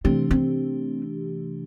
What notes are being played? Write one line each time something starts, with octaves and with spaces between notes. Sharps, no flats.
C3 E3 A3 C4 D4 G4
C4